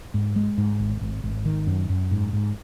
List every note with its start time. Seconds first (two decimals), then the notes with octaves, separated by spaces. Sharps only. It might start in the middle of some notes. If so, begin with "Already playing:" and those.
0.14 G#2
0.36 G#3
0.58 G#2
0.80 G#1
1.01 G#1
1.24 G#1
1.45 D#3
1.67 F#2
1.89 F#2
2.11 G#2
2.33 G#2